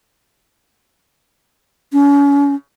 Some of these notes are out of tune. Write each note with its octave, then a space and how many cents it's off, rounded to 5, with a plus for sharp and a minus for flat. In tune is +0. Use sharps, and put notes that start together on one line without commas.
C#4 +35